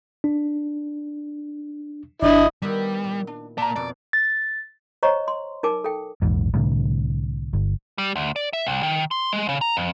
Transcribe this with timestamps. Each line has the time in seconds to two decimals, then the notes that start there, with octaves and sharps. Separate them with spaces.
0.24 D4
2.23 G1 D4 E4 D#5
2.62 D#3 G3 B3 E4
3.04 A#2
3.27 D4
3.58 A#3 D5 A5 A#5
3.76 F2 B2 D5
4.13 A6
5.03 C5 C#5 D#5 A#5 C#6
5.28 C6
5.63 D#4 A#4 G#5 A5 D6
5.84 A4 G5
6.22 A#1 E2 G#2
6.54 C2 A2 D3
7.53 G1
7.98 G3
8.16 D2
8.36 D5
8.53 E5
8.67 C2
8.83 D#3
9.11 C6
9.33 G#3
9.49 C#3
9.61 A#5
9.77 F2